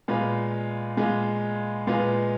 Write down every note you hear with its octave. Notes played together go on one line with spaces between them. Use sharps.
A#2 G#3 B3 F4 B4
A#2 G#3 B3 F4 B4
A#2 G#3 B3 F4 B4